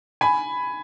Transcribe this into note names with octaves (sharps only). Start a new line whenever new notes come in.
G#5 B5